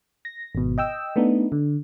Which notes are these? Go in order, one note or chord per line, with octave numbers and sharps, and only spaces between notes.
A#6
G#1 B2
D#5 G5 E6
A3 B3 D4 D#4
D3